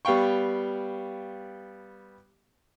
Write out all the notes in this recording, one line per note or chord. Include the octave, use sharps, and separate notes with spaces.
G3 B3 F5 G5 C#6